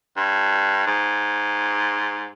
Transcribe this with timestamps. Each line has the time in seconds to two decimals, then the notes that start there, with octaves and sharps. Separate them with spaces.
0.17 G2
0.87 G#2